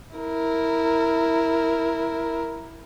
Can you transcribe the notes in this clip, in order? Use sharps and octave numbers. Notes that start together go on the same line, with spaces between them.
E4 A#4